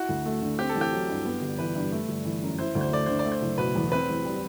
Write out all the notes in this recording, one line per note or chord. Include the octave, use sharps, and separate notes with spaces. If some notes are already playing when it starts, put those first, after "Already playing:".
Already playing: E4 F#4
D2
A3
D3
C4 G4
A4
A1
G4
F#3
G2
B3
G1
E3 B4
G2
A3
G1
E3
F#2
E4 C5
D2
C5
A3 D5
D3 C5
D5
A3
C5
F#1
B2 B4
E2
C4 B4
A1
G3